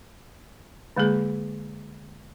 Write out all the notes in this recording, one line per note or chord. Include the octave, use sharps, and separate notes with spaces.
D3 G#3 A#3 G#4